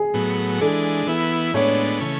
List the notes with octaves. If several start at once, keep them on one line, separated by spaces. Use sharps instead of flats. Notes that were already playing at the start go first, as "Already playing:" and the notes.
Already playing: G#4
A2 F#3 B3
E3 G#3 D4 A4
E3 B3 E4
A2 G#3 B3 D4 C#5
C#3 E3 A3 C#4